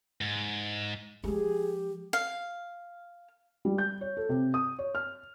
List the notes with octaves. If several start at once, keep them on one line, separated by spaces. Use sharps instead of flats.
G#2
F3 G#3 G4 G#4
F5
G3
G6
C#5
A4
C3
D#6
C#5
F6